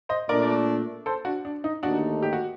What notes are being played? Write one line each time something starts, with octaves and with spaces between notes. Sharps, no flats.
C5 D#5
A#2 A3 D4 A#4 D5
A4 C5
D4 F#4
D4
D#4
D#2 D3 A3 D4 D#4 F#4
G4
F#4